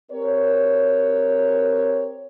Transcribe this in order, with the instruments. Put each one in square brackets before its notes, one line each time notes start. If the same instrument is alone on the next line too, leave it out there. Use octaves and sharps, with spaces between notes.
[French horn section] C4 G4 A#4 C#5